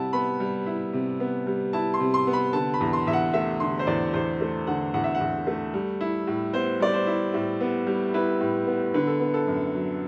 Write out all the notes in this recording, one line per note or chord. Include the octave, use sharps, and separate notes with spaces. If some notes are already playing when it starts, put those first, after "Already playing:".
Already playing: C3 G3 E4 F#5 A5
B3 B5
G3
E4
C3
B3
G3
E4 A5
C6
C3
C6
B3
B5
D3 A5
B5
E2
C6
E2 E5
F#5
A3 E5
D3 C6
C5
E2 D5
E2 C5
A3
D3 F#5
E2 F#5
E5
F#5
E2
A3
G3
E4
A2
B3 C5
G3 D5
C5
E4
A2
B3
G3
E4 B4
A2
B3
D3 B4
A4
B3
A4
F#2
F#3